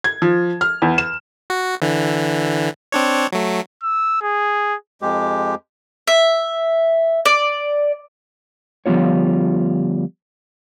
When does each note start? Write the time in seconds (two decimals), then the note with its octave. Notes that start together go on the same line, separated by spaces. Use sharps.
0.04 G#6
0.22 F3
0.61 F6
0.82 E2
0.98 E7
1.50 F#4
1.82 D3 E3
2.92 C4 D4 C#5
3.32 F#3 A3
3.83 E6
4.21 G#4
5.02 F2 G#3 G4
6.07 E5
7.25 D5
8.86 D2 F3 G3 B3 F4 C#5